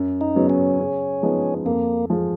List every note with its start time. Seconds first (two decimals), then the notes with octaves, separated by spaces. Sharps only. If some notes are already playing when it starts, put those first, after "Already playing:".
Already playing: F#2
0.21 D#4
0.35 C#3 F#3 B3
0.50 C#4
0.79 C#3
1.22 F3 G#3 B3 D#4
1.65 F2 A#3
2.10 F3 G#3